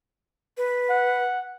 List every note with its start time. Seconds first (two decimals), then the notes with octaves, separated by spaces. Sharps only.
0.57 B4
0.90 F#5